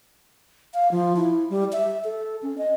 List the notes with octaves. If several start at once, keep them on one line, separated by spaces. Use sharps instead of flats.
F5
F3
E4
G3
E5
A4
C#4
D#5